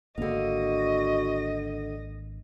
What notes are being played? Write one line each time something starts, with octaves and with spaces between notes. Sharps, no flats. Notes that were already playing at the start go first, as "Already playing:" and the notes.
G#1 D3 A#3 D4 F#4 D#5 F5